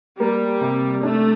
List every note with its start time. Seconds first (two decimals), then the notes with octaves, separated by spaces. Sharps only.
0.19 G3 A#3
0.61 C3
1.03 A3 D4